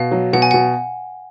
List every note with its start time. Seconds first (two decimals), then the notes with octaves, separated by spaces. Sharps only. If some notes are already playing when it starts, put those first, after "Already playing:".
Already playing: B2 F5
0.11 F#3
0.33 B2 F#5
0.42 G#5
0.51 B2 F#5